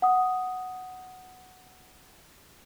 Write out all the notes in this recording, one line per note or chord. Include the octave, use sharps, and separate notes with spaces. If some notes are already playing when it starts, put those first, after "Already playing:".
F#5 D#6